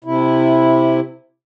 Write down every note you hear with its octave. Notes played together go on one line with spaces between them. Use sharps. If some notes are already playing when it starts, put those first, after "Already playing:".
C3 E4